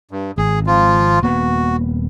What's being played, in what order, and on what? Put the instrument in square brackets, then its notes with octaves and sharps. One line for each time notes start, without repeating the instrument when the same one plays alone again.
[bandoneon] G2
[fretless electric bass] G#1 [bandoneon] G#4
[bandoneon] F3 F4
[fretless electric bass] D#1 A#3 B3 [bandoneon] F#4